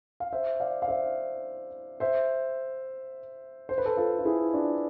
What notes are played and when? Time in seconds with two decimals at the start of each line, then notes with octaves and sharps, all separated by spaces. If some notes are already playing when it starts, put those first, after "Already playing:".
0.20 F5
0.33 C5 E5
0.60 D5 F5
0.82 F5
0.88 C5 E5
2.00 C5 E5
3.69 C5
3.78 B4
3.85 A4 C5
3.97 F4 A4
4.19 F4
4.25 E4 G#4
4.54 D4 F4